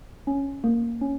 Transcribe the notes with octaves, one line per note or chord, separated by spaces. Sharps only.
C#4
A#3
C#4